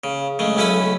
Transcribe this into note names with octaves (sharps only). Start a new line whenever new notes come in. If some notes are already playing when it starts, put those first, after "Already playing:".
C#3
C#3 G#3 A3
B1 A3 C#4 E4 B4 B5